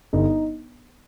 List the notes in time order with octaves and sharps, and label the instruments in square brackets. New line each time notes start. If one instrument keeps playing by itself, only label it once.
[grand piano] G1 D#4